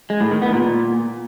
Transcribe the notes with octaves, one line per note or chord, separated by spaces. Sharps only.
G#3
A2
D#3
B3
A#2